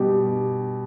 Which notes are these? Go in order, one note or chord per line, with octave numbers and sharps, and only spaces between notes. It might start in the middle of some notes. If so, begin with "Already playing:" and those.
Already playing: B2 G3 G4